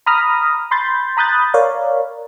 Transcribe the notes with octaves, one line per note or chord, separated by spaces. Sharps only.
A#5 B5 D#6 F6 A#6
B5 C6 G6 A6
A#5 B5 D#6 F#6 G6 A6
A#4 C#5 D5 F5